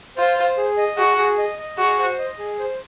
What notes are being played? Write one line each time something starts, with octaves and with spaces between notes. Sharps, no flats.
F4 C5
C5
G#4
D#5
F#4 G#4
G#4
D#5
D#5
F#4 G#4
C5
D#5
G#4
C5